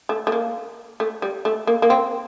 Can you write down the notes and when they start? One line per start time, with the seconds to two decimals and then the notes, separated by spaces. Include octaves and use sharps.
0.09 A3
0.27 A3
0.32 A#3
1.00 A3
1.22 G3
1.45 A3
1.67 A#3
1.82 A#3
1.90 C4